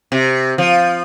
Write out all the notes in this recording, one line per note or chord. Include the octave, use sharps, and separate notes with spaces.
C3
F3